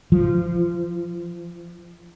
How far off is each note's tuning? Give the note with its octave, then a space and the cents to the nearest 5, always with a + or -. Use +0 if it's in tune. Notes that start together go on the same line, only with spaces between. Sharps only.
F3 -25